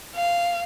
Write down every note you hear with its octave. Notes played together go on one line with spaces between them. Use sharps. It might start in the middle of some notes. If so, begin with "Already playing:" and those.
F5